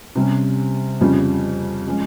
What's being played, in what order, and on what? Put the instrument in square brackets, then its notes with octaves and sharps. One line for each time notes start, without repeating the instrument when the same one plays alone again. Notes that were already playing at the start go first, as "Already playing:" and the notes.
[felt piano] C3 G3 C#4
F2 C#3 G3 C#4 F4
F3 G#3 C#4